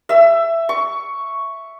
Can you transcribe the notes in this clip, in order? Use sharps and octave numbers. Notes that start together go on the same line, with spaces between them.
E5 E6
C#6